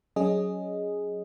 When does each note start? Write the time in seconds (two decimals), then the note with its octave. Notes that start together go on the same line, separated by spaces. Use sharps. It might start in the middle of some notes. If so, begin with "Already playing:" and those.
0.16 F#3 C#4 G#4 D#5